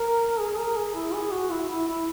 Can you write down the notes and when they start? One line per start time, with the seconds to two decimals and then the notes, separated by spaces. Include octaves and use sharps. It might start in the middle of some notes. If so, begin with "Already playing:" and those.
Already playing: A#4
0.39 G#4
0.58 A#4
0.76 G#4
0.95 E4
1.13 G#4
1.31 F#4
1.50 E4
1.69 E4
1.88 E4